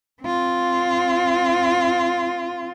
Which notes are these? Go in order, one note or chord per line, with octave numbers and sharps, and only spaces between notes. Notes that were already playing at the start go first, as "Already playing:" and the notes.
C4 F4